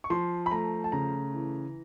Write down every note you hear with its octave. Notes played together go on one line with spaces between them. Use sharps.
C#6
F3 C6
B5
A3 A#5
A5
C#3 A#5
E3